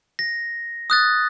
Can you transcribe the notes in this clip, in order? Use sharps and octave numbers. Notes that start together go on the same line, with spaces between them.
A#6
D#6 F#6 A6